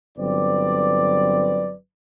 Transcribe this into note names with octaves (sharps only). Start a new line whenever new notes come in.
G1 F#3 C4 B4 D5